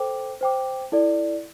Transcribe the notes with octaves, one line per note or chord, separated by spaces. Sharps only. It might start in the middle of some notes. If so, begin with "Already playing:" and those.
Already playing: A4 C5 G5 D6
C5 G5 D6
E4 A4 D5